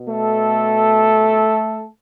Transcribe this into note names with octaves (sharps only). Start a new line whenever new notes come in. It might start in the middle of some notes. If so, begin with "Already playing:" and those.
Already playing: B2
A3 A4